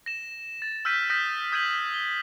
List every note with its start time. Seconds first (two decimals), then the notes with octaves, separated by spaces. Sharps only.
0.06 A#6 E7
0.62 A6
0.85 E6 F6 G6 B6 D#7
1.10 D#6 F6 G6 A#6 B6 D#7
1.52 D#6 G6 G#6 B6 D#7 F#7
1.94 G7